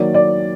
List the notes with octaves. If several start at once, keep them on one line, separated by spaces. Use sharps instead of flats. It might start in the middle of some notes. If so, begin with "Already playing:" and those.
Already playing: D#3 F#3 A#3 D5
D5